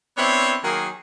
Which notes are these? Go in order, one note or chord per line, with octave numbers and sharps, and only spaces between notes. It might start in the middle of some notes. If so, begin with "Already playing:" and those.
B3 C4 D4 E4 C5 C#5
D#3 F#3 A#3 G#4